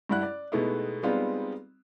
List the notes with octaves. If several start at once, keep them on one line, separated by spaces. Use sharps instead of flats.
G2 G3 E4 F#5 F#6
D5
B2 G#3 A3 B3 D#4 E4
G3 G#3 B3 C4 D#4 F4